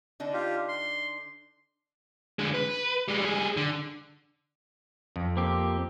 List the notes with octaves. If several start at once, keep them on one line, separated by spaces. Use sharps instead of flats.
D3 D4 D#4
F4 G4
C6
D3 G#3
B4
G3 G#3
G3 G#4
D3
F2
A#3 C4 G4